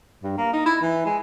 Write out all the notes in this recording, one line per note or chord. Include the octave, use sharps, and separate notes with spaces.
G2
A#3
D#4
E4
E3
G#3